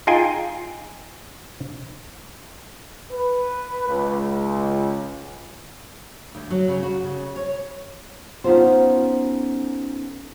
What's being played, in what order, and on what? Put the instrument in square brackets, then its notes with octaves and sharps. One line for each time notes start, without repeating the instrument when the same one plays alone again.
[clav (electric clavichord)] D#4 F4 G#4 G5 G#5
[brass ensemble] B4
C#2
[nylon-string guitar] D2
F#3
C#3
F#4
C#3
C#5
B3 C#4 D#4 F4 A4 C5